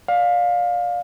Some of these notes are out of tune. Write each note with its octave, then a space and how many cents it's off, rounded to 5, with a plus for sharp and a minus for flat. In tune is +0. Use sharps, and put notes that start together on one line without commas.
D5 +0 F5 +20